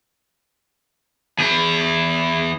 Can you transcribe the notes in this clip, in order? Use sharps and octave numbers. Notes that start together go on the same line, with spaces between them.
E2 G#4